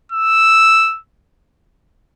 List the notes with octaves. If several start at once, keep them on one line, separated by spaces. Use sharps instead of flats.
E6